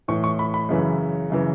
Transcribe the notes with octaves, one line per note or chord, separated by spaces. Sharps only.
A2 E3 C#6
C#6
B5
B5
F#2 C#3 E3
F#2 C#3 E3